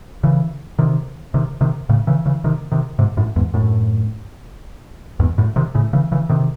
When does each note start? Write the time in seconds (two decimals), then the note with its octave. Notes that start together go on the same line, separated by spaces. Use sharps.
0.23 C#3 E3
0.79 C3 D#3
1.34 C3 D#3
1.61 C3 D#3
1.89 A2 C#3
2.07 C#3 E3
2.26 C#3 E3
2.44 C3 D#3
2.72 C3 D#3
2.99 G#2 C3
3.17 F#2 A2
3.36 E2 G#2
3.54 F#2 A2
5.20 E2 G#2
5.38 F#2 A2
5.56 C3 D#3
5.75 A2 C#3
5.93 C#3 E3
6.12 C#3 E3
6.29 C3 D#3